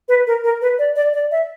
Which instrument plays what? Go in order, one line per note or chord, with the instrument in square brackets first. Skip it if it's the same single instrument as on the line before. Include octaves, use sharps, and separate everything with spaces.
[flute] B4
A#4
A#4
B4
D5
D5
D5
E5